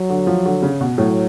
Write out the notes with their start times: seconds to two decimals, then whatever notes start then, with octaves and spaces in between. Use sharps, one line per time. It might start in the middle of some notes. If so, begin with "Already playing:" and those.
Already playing: F#3
0.10 D3
0.27 F3
0.46 D3
0.63 C#3
0.81 B2
0.98 A2 F#3